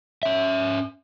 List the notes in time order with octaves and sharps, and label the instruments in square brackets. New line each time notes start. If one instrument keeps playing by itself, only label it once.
[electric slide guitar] C#4 E5